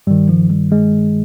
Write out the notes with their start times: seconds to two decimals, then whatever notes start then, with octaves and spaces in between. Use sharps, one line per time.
0.07 G2 D#3 G3
0.29 F3
0.50 G3
0.72 G#3